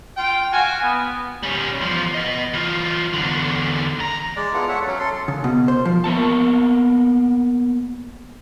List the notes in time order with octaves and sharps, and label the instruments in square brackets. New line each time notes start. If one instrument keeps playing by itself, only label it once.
[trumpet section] F4 G5
F#4 F5 G#5
B3
[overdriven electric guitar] G3 C#4
E2 F3
B3 D#5
E3 F4
E2 D3
D#2 A#5
[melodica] G#3 D5
B3 E4 F4 A4
A4 C#5 E5 F#5
F#3 C#4
A4 C6
[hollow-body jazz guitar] C#3
B2
C5
F3
[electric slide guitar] A#3 B3 A#4 A5